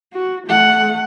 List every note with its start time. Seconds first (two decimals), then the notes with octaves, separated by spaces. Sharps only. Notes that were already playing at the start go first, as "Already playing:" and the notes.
0.13 F#4
0.47 A3 F#5